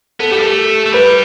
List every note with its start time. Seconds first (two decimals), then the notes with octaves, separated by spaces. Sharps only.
0.20 B3 A4
0.30 A3 G4
0.38 G3
0.43 A3 A4
0.86 A3
0.93 G3 B4